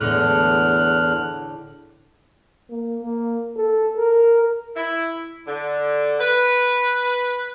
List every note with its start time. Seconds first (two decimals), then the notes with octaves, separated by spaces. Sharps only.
0.01 E2 A2 D3 G#3 F6 F#6
2.70 A#3
3.03 A#3
3.56 A4
3.98 A#4
4.76 E4
5.47 D3
6.20 B4